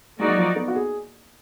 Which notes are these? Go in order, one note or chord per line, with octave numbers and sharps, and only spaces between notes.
G#3 A#3 D#4 F#4 D5
F#3
F3
B3
F#4
G#4